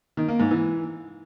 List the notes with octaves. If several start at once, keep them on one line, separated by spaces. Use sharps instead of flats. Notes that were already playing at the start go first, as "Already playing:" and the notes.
D#3
A#3
G#2
E3